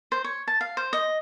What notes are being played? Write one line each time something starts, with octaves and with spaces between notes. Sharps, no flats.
C5
C#5
A5
F5
C5
D#5